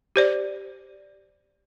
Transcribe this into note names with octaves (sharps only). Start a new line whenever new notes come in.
G4 C5 D5